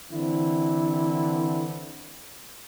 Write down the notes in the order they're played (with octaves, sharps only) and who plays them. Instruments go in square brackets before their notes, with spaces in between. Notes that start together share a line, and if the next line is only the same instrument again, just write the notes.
[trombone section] D3 E3 C4 E4